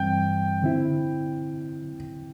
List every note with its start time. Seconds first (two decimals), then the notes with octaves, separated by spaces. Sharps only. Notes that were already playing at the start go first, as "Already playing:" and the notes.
Already playing: G2 E3 G3 C4 G5
0.62 D3 C4 E4